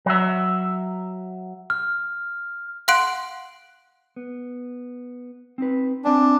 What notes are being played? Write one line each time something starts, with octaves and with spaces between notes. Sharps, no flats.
F#3 E5
F6
F5 F#5 C6 F#6 D7
B3
C4 D#4 B4
C4 D4 E5 G#5